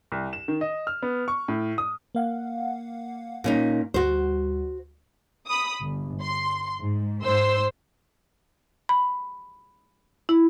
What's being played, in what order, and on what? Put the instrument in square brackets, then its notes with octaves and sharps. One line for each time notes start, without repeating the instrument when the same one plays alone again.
[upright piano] C2
E7
D#3
D#5
F6
B3
C#6
A2
D#6
[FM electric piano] A#3 F5 F#5
[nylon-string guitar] A#2 C#4 D#4
[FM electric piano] D2 G3 [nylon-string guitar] F#4 C5
[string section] B5 D#6
G1
C6
G#2
G#2 C5 C6 E6
[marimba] B5
E4